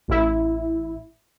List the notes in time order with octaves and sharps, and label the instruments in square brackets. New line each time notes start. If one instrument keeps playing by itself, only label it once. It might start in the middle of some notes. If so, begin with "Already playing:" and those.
[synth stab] A1 E4